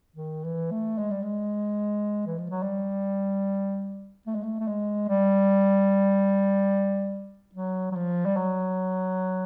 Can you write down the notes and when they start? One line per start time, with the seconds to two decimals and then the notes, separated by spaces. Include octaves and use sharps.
0.16 D#3
0.44 E3
0.71 A3
0.98 G#3
1.11 G3
1.23 G#3
2.26 E3
2.38 F3
2.50 F#3
2.63 G3
4.27 A3
4.35 G#3
4.43 A3
4.60 A3
4.67 G#3
5.09 G3
7.55 F#3
7.92 F#3
7.96 F3
8.26 G3
8.37 F#3